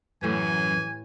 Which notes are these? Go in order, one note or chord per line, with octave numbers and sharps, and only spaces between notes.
F#2 A2 E3 G4 G#5